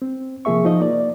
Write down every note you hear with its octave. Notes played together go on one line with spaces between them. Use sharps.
C4
C3 F3 A#3 G#4 E5 C#6
F3 D#4 D#5
A#3 D5